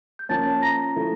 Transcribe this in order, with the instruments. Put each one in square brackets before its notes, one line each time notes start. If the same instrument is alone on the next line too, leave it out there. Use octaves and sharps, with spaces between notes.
[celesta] G6
[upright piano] F3 A#3 C#4 [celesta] A5 A6
[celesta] A#5 A#6
[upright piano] F3 A3 E4